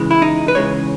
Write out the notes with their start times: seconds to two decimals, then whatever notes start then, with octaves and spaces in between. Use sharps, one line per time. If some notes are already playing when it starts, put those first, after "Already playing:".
Already playing: C#2 C#3 E3 G#3
0.11 E4
0.22 D#4
0.48 B4
0.55 C#2 C#3 E3 G#3 C#5